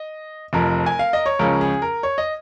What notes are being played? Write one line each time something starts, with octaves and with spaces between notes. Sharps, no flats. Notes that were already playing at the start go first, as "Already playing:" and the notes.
Already playing: D#5
F1 F2 F3 A#4
G#5
F5
D#5
C#5
C#2 C#3 F3 C#4 A#4
G#4
A#4
C#5
D#5